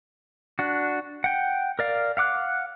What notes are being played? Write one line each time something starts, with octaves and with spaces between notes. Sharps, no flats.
D4 F#4
F#5 G5
A#4 D5 F5
F5 F#5 D6 F#6